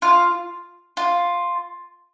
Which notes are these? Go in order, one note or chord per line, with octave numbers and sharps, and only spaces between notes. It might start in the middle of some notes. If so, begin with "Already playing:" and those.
F4
F4